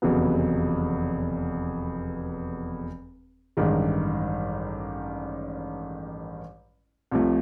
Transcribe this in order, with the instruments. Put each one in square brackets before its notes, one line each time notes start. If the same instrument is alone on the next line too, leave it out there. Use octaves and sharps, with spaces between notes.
[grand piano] F1 E2 C#3 F#3 B3
A1 G2 D#3 G#3
C2 C3 F3 A3